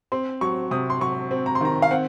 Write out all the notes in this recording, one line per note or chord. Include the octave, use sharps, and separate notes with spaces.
C4 C6
F#3 C#6
C3 D#6
C6
F#3 C#6
C4
A#5
C6
D#3 A#5
F5
C4 F#5